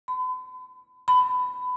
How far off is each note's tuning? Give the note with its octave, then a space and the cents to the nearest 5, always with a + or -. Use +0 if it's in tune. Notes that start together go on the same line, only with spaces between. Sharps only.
B5 +45
B5 +20